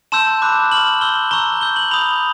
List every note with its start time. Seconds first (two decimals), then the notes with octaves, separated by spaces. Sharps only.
0.12 A5 C6 E6 G6 E7
0.42 B5 D6 F#6
0.72 C#6 F6 F#7
1.01 C6 E6 G6 G7
1.31 A#5 C#6 E6 G6 G7
1.61 C#6 E6 G6 G7
1.76 F#7
1.91 B5 D#6 G6 F7